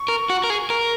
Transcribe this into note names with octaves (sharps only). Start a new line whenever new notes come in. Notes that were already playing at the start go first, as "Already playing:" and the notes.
Already playing: C#6
A#4
F#4
A#4
G#4
A#4